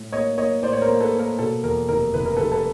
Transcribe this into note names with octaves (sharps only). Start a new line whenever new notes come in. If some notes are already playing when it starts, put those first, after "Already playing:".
Already playing: A2
A#3 C#5 D#5
A#3 C#5 D#5
A2 C5 D5
C#5
A#4 C5
A#3
A4 B4
A#3
A#4
B2 A4
E2 A#4
F1 A#4
F1 B4
A#4
A4 B4
F1
A4 B4